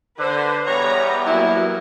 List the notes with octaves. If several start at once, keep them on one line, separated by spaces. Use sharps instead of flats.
D3 B4 C5
E2 G3 B3 C#5 A#5
F#3 A#3 E4